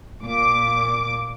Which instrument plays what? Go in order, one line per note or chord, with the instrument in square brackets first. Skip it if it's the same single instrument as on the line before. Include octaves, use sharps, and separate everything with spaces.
[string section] A#2 D6